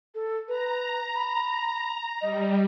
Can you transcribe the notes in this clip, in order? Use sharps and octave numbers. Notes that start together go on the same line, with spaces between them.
A4
B4 A#5
B5
G3 D#5